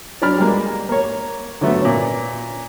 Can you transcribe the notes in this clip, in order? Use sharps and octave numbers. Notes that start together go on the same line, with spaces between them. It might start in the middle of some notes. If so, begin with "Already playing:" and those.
F#3 D4 D5 B5 F6
G3 G#3 A#3
A#3 C#5
D3 F#3 A3 B3
A#2 C#4